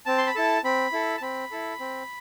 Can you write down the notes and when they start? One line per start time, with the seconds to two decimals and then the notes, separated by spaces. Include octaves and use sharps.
0.06 C4 A5
0.18 C6
0.27 B5
0.35 E4 A4 A5
0.64 C4 B5
0.92 E4 A4
1.17 A5
1.22 C4 B5
1.51 E4 A4
1.80 C4